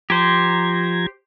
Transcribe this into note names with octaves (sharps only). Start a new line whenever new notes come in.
F3 G4 C5 A#5 G#6